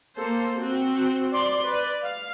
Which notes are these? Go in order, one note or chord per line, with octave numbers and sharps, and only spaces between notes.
A#3 A4 C5
C4 F#4
D5 C6
B4 D5
F5